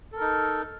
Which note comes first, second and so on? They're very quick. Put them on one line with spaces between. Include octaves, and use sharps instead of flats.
A4 A#4 D#4